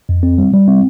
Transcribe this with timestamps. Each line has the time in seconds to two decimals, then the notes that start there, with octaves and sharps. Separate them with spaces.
0.09 F2
0.23 C4
0.38 G3
0.53 G3
0.68 C4